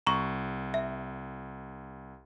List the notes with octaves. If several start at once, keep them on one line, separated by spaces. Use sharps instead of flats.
C2 A#5 C#6
E5